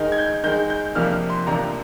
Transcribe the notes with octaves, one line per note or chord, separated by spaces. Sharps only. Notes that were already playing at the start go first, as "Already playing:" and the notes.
Already playing: D#3 G#3 D#4 G6
G#6
G6
D#3 G#3 D#4 G6
G6
F2 C3 F3 A#3 D4 F6
C6
F2 C3 F3 A#3 D4 A#5